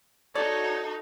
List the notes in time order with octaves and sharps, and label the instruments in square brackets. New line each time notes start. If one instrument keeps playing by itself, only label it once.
[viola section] D#4 F#4 [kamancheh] A4 [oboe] C#5 [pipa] D5